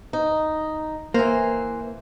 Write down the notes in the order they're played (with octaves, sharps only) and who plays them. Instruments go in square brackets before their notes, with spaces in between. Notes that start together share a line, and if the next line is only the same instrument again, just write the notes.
[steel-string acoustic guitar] D#4
[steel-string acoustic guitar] E3 C5 [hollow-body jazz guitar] A#3